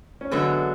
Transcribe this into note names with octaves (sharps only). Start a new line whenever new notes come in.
C#4
E2 D3 F#3 G#3 B3